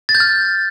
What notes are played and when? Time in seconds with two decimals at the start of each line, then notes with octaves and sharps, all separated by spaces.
0.09 A6
0.15 G6
0.20 F6